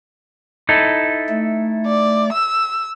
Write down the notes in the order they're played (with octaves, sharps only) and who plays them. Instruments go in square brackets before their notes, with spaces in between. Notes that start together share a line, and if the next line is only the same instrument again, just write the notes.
[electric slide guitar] D#4 E4 A4
[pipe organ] A3
[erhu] D5
E6